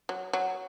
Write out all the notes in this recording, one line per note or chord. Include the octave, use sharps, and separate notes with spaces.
F#3
F#3